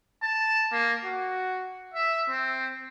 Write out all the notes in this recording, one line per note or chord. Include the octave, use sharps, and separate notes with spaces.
A5
A#3
F#4
E5
C4